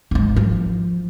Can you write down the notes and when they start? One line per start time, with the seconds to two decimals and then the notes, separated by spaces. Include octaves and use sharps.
0.11 G#1 G#2
0.36 F3